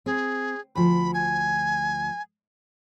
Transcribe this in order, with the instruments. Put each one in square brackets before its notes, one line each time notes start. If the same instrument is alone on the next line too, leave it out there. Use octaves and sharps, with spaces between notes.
[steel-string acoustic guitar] C4 [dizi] G#4
[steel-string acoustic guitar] D2 F3 [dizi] B5
[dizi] G#5